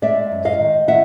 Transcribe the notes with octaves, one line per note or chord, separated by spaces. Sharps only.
G#3 D5 E5
F#2
D#5 F5
D#3
D#3 E5 F#5